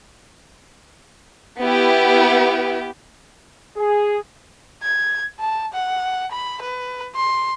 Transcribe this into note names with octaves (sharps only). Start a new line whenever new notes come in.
B3 E4 G4
G#4
G#6
A5
F#5
B5
B4
C6